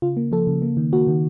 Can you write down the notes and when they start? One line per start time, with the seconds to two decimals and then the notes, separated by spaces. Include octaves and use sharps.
0.02 C#3 F4
0.17 A#3
0.32 F3 A4
0.47 C#3
0.62 A#3
0.77 D#3
0.93 A#3 F#4
1.07 D#3